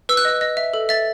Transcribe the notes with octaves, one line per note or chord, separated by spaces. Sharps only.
B4 E6
F#6
D#5
D#5
E5
A4
E5 A6